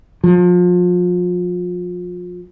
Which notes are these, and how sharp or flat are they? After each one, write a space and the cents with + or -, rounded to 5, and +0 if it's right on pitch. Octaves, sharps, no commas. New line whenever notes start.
F3 +30